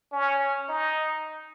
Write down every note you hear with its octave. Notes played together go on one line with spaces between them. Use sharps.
C#4
D#4